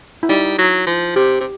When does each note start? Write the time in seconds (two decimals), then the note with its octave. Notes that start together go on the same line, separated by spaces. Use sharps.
0.23 E4
0.29 G3 D#4
0.58 F#3
0.87 F3
1.16 C3 G4
1.41 C3